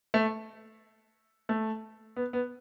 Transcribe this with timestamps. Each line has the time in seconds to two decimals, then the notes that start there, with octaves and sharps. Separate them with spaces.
0.14 A3
1.49 A3
2.16 B3
2.33 B3